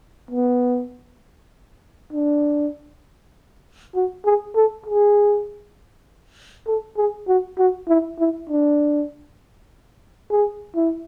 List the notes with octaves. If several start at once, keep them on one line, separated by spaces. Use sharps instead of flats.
B3
D4
F#4
G#4
A4
G#4
A4
G#4
F#4
F#4
E4
E4
D4
G#4
E4